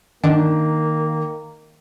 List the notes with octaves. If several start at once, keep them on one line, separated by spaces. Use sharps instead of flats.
D#3 A#3 D4